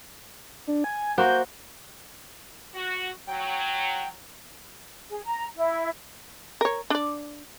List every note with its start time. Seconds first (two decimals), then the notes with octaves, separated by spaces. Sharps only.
0.67 D4
0.84 G#5
1.18 A#3 F#4 C5 G6
2.74 F#4
3.28 F#3 G5
5.10 G#4
5.25 A#5
5.56 E4
6.61 A#4 C#5
6.90 D4 D5